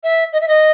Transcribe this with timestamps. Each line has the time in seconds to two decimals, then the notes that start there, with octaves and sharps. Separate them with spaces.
0.04 E5
0.33 D#5
0.41 E5
0.48 D#5